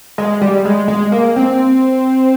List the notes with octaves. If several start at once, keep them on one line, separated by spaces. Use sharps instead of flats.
G#3
G3
G#3
G#3
A#3
C4